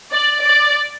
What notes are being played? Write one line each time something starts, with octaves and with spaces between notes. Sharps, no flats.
D5
D5